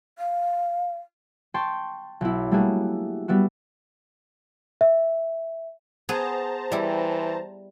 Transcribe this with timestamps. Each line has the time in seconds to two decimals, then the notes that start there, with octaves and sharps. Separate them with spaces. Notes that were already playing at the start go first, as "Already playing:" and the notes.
0.18 F5
1.54 G5 A5 C6 C#6
2.21 B1 E4
2.51 G3 A3 A#3 D4 F#4 G#4
3.28 G3 B3 E4 F#4
4.81 E5
6.09 B3 G#4 C5 A5 A#5
6.72 E3 G3 E4